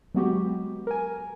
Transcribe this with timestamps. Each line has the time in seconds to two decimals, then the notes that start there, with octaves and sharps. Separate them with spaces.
0.15 F#3 G#3 B3 F#4 G4
0.87 A#4 G#5